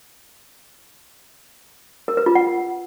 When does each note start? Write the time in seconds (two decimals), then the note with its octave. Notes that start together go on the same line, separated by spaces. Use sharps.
2.08 A#4
2.17 B4
2.26 F4
2.35 F#5